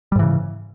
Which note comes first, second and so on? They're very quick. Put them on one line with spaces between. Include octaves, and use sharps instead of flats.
G3 G#2 E3 C#3